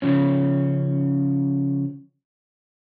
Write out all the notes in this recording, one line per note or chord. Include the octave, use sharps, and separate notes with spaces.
C#3 F3 C#4